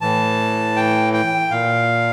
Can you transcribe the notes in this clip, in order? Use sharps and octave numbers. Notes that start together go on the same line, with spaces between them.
A2 E3 A5
G5
G5
A#2 F5